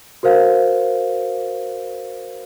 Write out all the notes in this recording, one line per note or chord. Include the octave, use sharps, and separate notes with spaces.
F#4 A#4 C5 F5